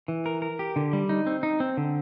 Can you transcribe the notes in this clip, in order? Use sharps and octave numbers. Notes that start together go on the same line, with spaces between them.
E3
A#4
A#4
G4
D3
G3
D#4
C4
D#4
C4
D3